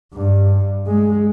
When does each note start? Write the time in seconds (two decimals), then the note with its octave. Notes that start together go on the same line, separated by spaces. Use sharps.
0.14 G2
0.87 G#3